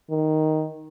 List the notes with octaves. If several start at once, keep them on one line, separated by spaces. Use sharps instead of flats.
D#3